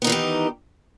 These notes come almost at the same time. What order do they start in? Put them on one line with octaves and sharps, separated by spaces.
B3 D#4 E3 D#3 G4